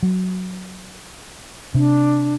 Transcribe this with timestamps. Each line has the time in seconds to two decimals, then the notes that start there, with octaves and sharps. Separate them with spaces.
0.03 F#3
1.75 C3 D4